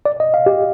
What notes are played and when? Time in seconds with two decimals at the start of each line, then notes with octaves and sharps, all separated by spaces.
0.06 D5
0.20 D#5
0.34 F5
0.46 G4